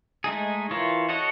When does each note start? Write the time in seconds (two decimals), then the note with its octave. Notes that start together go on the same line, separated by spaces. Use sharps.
0.24 G#3 A3 D#4 G#4
0.71 E3 E4 F4 A#4 C#5
1.09 F#4 A4 C#5 D#5 F#5